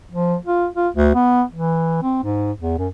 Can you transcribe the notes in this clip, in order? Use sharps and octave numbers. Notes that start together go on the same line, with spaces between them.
F3
F4
F4
D2
B3
E3
C4
G#2
E2
F#2